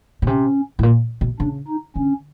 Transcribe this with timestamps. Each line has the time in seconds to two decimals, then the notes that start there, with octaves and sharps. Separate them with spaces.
0.22 B2
0.27 C3 C#4
0.79 A2
0.83 A#2
1.21 B2
1.40 C#3 D4
1.68 D#4
1.96 D3 C#4